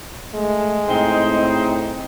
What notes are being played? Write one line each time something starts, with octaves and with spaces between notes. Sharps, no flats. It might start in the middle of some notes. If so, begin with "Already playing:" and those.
G#3 A3
A2 C4 D#4